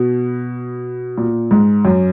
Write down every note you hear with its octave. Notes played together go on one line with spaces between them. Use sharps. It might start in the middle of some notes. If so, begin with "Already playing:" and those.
Already playing: B2
A#2
G#2
F#2